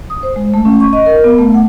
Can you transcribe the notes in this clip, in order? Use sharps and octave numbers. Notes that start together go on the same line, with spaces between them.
D#6
C5
G#3
A3
C#4
C#6
D#5
A#4
B3
A3
F#5